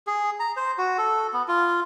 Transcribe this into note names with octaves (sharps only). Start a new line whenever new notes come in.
G#4
A#5
C5
F#4
A4
B3
F4